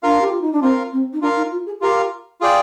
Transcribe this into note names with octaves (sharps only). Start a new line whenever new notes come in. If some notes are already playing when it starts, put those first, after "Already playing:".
D4 F4 A#4 F5
G4
F4
D#4
D4
C4 F4 A#4 F5
C4
D#4
D4 F4 A#4 F5
D#4
F4
G#4
F4 G4 A#4 F5
F4 G#4 D5 G5